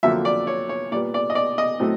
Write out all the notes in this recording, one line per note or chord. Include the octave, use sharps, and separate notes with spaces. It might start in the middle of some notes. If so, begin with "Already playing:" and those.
F2 D3 F#3 A#3 E5
D5
C#5
C#5
A#2 G3 B3 D5
D5
D#5
D5
D#5
A2 F#3 A3 C4